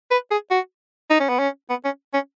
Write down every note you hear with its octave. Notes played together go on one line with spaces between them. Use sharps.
B4
G#4
F#4
D#4
C#4
B3
C#4
B3
C#4
C#4